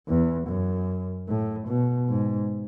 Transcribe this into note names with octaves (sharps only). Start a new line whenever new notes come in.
E2
F#2
A2
B2
G#2